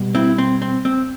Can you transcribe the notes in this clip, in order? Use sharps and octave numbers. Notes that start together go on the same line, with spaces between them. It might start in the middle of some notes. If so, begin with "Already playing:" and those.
Already playing: B2 G3 B3
C4 E4
C4
C4
C4